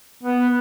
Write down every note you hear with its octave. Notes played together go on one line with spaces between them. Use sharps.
B3